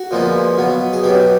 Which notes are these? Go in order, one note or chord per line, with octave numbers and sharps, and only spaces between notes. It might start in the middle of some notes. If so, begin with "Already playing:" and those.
Already playing: F#4
A#2 F3 G#3 B3
B2 F#3 B3
G#4
B2 F#3 B3 G4